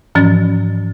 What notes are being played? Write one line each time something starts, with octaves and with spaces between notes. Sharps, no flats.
G#2 E3 F3 C#4 A6